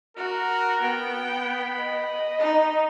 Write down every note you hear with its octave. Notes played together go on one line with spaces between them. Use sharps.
F#4 A#4
B3 G5
B5
D#5
D#4